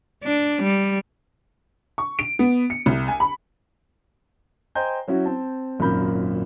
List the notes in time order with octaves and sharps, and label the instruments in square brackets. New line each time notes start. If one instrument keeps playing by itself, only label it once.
[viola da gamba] D4
G3
[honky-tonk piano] C#6
D7
B3
C#7
C2
G#5
B5
[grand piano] C5 D#5 G5 G#5 A#5 G6
F#3 C#4 E4 F#4
C4 A5
G#1 F#2 A#2 A#4 B5 G6